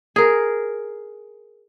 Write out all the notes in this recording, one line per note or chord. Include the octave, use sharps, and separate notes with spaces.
G#4 A#4